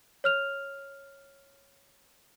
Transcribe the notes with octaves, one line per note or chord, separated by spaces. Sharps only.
C#5 F6 F7